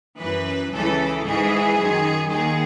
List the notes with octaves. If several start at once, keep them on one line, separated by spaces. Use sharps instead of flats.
F#2 E3 B4
C#2 C#3 E3 A4
G#2 E3 G#4
F#2 D#3
D#2 D#3 G#4